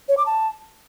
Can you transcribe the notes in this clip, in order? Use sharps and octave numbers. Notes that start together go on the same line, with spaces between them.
C#5
D6
A5